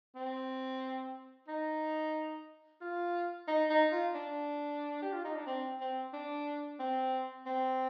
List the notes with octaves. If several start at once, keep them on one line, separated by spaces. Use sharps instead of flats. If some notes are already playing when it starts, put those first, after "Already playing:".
C4
D#4
F4
D#4
D#4
F4
D4
G4
F4
D#4
D4
C4
C4
D4
C4
C4